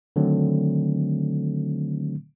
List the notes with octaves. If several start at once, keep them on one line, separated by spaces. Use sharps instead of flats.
D3 D#3 F#3 A3 C4